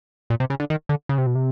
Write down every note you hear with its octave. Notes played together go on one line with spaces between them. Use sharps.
A#2
C3
C#3
D3
D#3
D3
C#3
C3
B2
C3